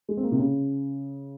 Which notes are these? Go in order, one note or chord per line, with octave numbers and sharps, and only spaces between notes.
G#3
C4
A#3
C3
C#3